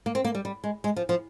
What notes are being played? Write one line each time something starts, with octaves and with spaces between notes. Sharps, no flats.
A#3
C4
A#3
G3
G3
G#3
G#3
F3
F3